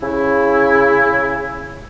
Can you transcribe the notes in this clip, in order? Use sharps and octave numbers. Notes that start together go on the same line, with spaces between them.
C#3 E4